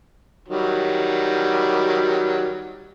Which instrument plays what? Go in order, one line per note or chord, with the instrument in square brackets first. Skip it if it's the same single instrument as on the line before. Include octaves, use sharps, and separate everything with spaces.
[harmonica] D#3 F#3 G3